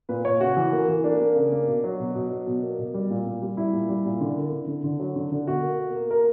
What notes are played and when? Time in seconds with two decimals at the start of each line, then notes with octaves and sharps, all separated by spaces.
0.09 A#2 B4
0.25 A#2 C#5
0.40 C#3 F#4
0.57 E3
0.72 A#3
0.88 E3
1.04 A#3 D4
1.20 A#3
1.36 C#3
1.51 A#3
1.67 B2
1.84 F#3
1.99 B2
2.15 B2
2.30 F#3
2.46 B2
2.62 A#3
2.78 B2
2.94 G3
3.10 A#2
3.26 A#2
3.42 G3
3.57 G3 E4
3.73 A#2
3.89 G3
4.05 A#2
4.21 D3
4.36 A#3
4.52 D3
4.68 D3
4.84 D3
5.00 F#3
5.16 D3
5.32 D3
5.47 B2 F#4
5.63 A#3
5.79 A#3
5.95 A#3
6.10 A#3 A#4